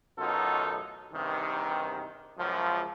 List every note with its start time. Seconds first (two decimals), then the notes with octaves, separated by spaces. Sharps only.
0.18 A1 F#2 B2 D#4 F4 A4
1.12 E2 G2 C3 D#3
2.38 C#2 F#2 F3